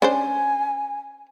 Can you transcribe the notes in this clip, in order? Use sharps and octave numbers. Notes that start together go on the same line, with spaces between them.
C#4 D4 C5 G#5